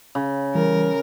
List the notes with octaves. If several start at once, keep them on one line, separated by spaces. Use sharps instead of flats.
C#3
E3 G3 A#4